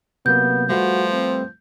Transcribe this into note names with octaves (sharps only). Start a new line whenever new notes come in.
C3 F#3 A#3 B3 G6
F3 G3 A3 F#4 B4
C4